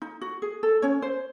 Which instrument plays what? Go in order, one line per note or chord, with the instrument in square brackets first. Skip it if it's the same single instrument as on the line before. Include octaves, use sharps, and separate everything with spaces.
[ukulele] D#4
F#4
G#4
A4
C#4 C#5
C5